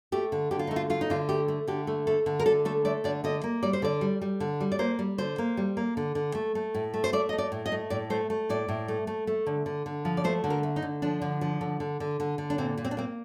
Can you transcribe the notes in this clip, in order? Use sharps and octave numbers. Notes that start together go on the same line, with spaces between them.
A3 G4
D3
D3 G4
F4
D#4
A3
F4
A3 F4
D#4
D3 F4
A3 G4
A3
D3 G4
A3
A3 A4
D3
A#4
D3 A4
A3 A4
A3 D5
D3 D5
D3 D#5
A#3
G3 D5
C5
D3 D5
G3
G3
D3
G3
D5
A#3 C5
G3
D3 C5
A#3
G3
A#3
D3
D3
A3
A3
A2
A3
C5
A3 D5
A3 D#5
D5
A2
D#5
A3
A2 D5
A3 C5
A3
A2 D5
A2
A3
A3
A3
D3
D3
D3
F3
D5
A3 C5
D3
A#4
A3
D#4
D3
F3 D4
D3
F3
D3
D3
D3
D3
D3
D4
A#2 C4
A#2
C4
D4
A#3 C4